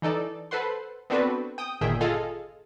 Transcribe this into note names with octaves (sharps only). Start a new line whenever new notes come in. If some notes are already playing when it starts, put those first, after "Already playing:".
E3 D#4 A4 D5
A4 B4 C5 F#5 C6
B3 C4 D4 F#4 A4 B4
G5 D#6
G1 A#2 D#3 G#4 E5 G5
F4 G#4 A4 D#5 F5